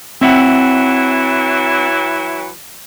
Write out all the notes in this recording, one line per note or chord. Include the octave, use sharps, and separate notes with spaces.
E3 F#3 C4 E4 E5 F#5